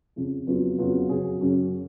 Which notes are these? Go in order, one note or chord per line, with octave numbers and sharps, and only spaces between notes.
F2 C#3 F3
F2 C#3 F#3 B3 F4
F2 C#3 F#3 B3 F4
F#2 C#3 F#3 C#4 G#4
F#2 C#3 F#3 C#4 G#4